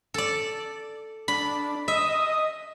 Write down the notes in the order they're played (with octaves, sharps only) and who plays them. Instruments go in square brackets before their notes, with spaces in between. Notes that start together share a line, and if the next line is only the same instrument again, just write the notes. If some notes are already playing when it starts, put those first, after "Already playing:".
[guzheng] A4 D5
[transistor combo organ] D4 [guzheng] B5
[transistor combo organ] D#5 [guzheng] E5